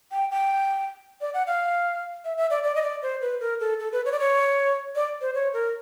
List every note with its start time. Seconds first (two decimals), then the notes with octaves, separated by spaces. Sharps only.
0.12 G5
0.31 G5
1.21 D5
1.34 F#5
1.47 F5
2.25 E5
2.37 E5
2.50 D5
2.63 D5
2.75 D#5
2.82 D5
3.03 C5
3.21 B4
3.41 A#4
3.60 A4
3.80 A4
3.92 B4
4.05 C#5
4.12 D5
4.20 C#5
4.96 D5
5.21 C5
5.34 C#5
5.54 A#4